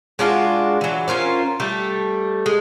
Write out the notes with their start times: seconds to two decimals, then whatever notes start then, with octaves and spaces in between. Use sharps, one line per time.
0.19 G#3 D4 F4 F#4
0.81 E3 F#3
1.08 C#4 F4 A#4 C5
1.60 G3 A3 A4
2.46 G#3